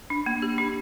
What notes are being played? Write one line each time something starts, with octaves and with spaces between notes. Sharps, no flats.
D4
A#3
G4
D4